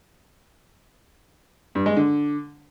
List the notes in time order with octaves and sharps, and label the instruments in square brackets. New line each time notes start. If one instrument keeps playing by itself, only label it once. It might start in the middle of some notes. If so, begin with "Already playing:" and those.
[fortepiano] G2
G#3
D3